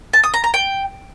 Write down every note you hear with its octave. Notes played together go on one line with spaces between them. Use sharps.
A5
D#6
A#5
A#5
G5